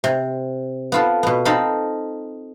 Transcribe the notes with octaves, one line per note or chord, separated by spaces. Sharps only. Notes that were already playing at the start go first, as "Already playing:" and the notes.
C3
B3 F4 A4
B2 B3
C4 D#4 A4 F5 B5